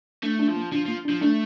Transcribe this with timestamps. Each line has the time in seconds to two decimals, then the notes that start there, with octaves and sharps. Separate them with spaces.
0.23 A3 D4
0.39 D4
0.48 F3
0.56 A#3
0.72 F3 D4
0.85 F3 A#3
1.05 F3 D4
1.22 A3 D4